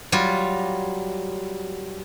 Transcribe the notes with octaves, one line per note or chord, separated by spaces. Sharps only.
F#3 G3 F4